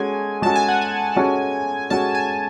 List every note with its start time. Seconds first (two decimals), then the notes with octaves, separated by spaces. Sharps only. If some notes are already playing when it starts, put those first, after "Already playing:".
Already playing: G#3 C#4 F#4 A4 G#5
0.42 G#3 C#4 F#4 A4 A5
0.55 G#5
0.68 F#5
0.81 G#5
1.16 G#3 C#4 F#4 A4
1.90 G#3 C#4 F#4 A4 A5
2.15 G#5